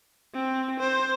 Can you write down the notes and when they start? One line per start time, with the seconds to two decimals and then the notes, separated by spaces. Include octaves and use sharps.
0.34 C4
0.80 C5